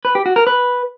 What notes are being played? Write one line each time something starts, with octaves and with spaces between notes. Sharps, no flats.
B4
G4
F#4
A#4
B4